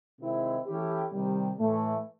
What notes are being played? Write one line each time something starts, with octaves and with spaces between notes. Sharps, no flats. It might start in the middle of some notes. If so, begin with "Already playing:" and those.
C3 D#3 G#3 C4 E4
E3 A3 C#4 E4 G4
C3 D#3 G3
A2 E3 A3